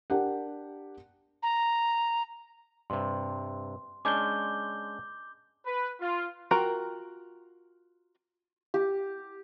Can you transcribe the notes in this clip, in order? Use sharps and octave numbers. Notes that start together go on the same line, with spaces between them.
D4 G4 A#4 F#5
A#5
G2 C3 C6
G#3 C#4 D4 D6 G6 G7
B4
F4
F4 F#4 A#4 G5 A#5
G4